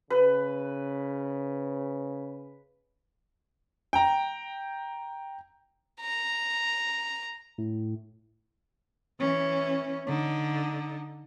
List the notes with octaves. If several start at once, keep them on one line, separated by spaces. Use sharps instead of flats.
C#3 B4
G5 A#5
A#5
A2
E3 C#4
D3 D#4